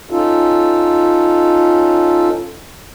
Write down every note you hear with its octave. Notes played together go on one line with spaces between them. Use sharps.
C#4 D#4 F4 A4